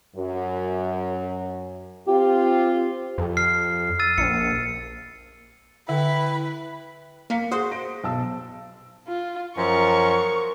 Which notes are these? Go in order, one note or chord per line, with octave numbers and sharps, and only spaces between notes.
F#2
C4 F4 G4
F2
F6 C7
E6 A6 D#7
A#1 C#7
D3 E4 B4 E5 G5
A#3 F5 B6 C#7
F#4 G#4 C5 D#6
A#6 D7
B1 A5 E6
F4
F#2 F3 F#3 A#4 C#6